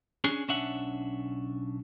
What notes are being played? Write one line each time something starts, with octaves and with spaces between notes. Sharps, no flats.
C#4 D4 G#4
B1 C#4 D4 E5 F#5